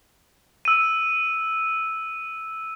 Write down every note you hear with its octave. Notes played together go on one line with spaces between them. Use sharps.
E6 D#7